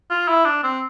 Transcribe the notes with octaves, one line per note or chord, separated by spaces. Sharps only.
F4
E4
D4
C4